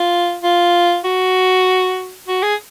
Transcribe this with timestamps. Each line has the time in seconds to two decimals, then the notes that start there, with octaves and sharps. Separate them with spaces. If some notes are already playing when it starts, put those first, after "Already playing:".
Already playing: F4
0.43 F4
1.04 F#4
2.28 F#4
2.43 G#4